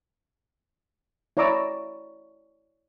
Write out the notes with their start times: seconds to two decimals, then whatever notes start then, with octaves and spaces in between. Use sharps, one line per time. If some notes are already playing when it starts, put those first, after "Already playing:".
1.37 E4 C#5 D5 A#5 D6 E6